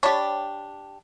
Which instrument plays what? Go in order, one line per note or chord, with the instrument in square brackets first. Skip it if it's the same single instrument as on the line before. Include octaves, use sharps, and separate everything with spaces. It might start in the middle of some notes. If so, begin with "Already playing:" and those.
[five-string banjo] D4 G4 [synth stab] C#5 A5 B5